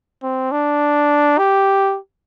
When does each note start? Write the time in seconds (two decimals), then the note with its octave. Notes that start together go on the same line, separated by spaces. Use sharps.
0.23 C4
0.51 D4
1.38 G4